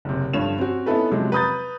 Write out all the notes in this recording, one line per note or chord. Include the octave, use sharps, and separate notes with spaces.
F#1 C3
G2 D3 F3 C#5 E7 F7
C4 C#4 F#4
B3 C#4 D#4 E4 A4 B4
C3 F3 F#3 G#3
B4 A#5 D#6 G6 A6